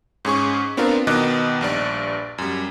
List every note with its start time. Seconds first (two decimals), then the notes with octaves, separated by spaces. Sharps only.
0.25 G#2 C#4 G#4 C#6
0.77 B3 C4 D4 F4 A#4
1.07 B2 D#3 B3 D#5 D6 F#6
1.61 A#1 G2 D5
2.38 F#2 G3